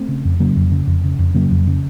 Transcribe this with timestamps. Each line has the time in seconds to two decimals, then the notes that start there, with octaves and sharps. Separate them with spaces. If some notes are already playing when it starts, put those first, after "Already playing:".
Already playing: A3 C4
0.09 C#3
0.25 F2
0.40 C#3 F#3 A#3
0.56 F2
0.72 C#3
0.87 F2
1.04 C#3
1.19 F2
1.34 C#3 F#3 A#3
1.51 F2
1.67 C#3